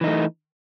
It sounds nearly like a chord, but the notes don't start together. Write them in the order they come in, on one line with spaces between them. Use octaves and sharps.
E3 D#4 A3